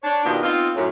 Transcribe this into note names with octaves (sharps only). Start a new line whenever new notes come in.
D4 C#5
B2 D#3 B3 D4 F4 G4
B3 C4 D#4 F4
F#2 A2